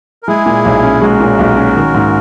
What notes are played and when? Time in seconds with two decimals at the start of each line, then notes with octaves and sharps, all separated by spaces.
0.23 A#4
0.28 G#3 E4 G#4
0.46 A#2
0.65 B1
0.83 C#4
1.01 G#3 F#4 A#4
1.20 A#2
1.39 B1
1.57 C#4
1.76 D#3
1.94 G#2